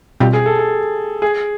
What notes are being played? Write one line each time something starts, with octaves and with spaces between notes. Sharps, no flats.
B2 G3 C4 F4 G4
G#4
A4
A4
G#4